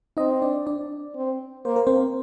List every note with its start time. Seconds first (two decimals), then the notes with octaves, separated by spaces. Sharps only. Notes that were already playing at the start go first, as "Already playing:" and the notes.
0.17 C4 D#4 D#5
0.42 D4 D5
0.67 D4 D5
1.15 C4
1.65 A#3 C5
1.76 A#4
1.87 C4 C5